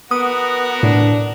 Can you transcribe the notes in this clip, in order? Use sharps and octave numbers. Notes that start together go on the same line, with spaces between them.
B3 F#4 A#4 D#6
A2 D4